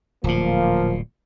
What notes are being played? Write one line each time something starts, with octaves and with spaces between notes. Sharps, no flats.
D1 A#2 F3 A#3